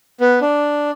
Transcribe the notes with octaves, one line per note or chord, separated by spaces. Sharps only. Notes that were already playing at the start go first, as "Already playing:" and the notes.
B3
D4